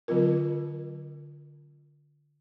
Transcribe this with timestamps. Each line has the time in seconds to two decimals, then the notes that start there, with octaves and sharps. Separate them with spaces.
0.08 D3 F#3 C4 F4 A#4